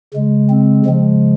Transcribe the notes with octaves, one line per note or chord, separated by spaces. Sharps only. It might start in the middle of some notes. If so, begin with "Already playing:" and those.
C#3 G#3
C4
C#3 F3 G#3